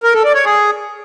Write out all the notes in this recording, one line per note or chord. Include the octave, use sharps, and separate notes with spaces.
A#4
A4
D5
C#5
G#4